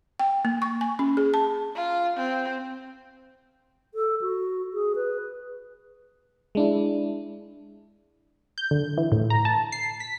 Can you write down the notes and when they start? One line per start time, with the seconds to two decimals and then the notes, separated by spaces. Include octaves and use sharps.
0.20 G5
0.45 A#3
0.62 C#6
0.81 G#5
0.99 C#4
1.17 G#4
1.34 A5
1.75 F4
2.16 C4
3.94 A4
4.22 F#4
4.74 G#4
4.96 B4
6.55 G#3 D4 E4
8.58 G6
8.71 D3
8.98 E3
9.12 A2
9.30 A#5
9.45 A5
9.72 C7
10.00 B6